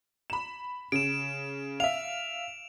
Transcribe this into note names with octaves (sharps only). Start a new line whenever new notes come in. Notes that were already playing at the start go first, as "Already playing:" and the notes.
B5 E7
C#3 D7 E7
E5 F5 F7